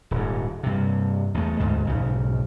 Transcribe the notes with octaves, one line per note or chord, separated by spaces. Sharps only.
D#1 G#2
G2 C3
E2 A3
D2 G#2
B1 G#2 C#3